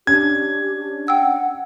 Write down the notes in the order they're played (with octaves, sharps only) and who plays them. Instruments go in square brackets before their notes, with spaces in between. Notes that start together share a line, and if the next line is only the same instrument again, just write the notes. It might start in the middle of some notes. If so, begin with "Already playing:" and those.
[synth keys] C#4 D4 [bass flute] G4 [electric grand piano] G#6
[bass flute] F#5 [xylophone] G5 E6